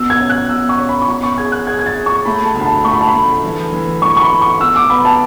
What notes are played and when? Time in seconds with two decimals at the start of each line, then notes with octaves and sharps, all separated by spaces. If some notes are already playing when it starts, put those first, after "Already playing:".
Already playing: B2 E6
0.10 G#6
0.20 C#4
0.29 F#6
0.49 B2 E6
0.69 C#6
0.79 C#4
0.89 B5
1.02 C#6
1.08 B2 B5
1.23 C#6
1.37 G#4 G#6
1.52 F#6
1.66 G#4 G#6
1.79 G#6
1.86 A6
1.96 G#4
2.06 C#6
2.25 A3 B5
2.45 A5
2.55 D2
2.61 B5
2.65 A5
2.84 A3 C#6
2.92 B5
3.01 A5
3.08 B5
3.14 A3
3.44 E3
3.73 E3
4.02 E3 C#6
4.17 C#6
4.21 B5
4.31 A3
4.42 C#6
4.61 B2 E6
4.76 D6
4.90 B3 B5
5.05 A5